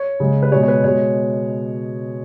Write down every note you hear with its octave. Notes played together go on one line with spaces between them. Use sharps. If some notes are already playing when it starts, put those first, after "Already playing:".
Already playing: C#5
C#3 G#3
B4
B2 G#3 C#5
C#5
B4
B2 G#3 C#5